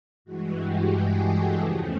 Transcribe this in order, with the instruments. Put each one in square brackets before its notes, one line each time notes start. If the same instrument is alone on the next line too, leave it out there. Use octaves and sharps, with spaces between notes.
[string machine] G2 E3 G#3 F#4
G4
G#4
A4
E2 C#3 F3 A3